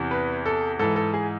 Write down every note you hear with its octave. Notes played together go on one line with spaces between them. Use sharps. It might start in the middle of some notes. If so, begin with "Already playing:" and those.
Already playing: E2 C3 E3
B4
A4
G#2 E3 A4
A4
G#4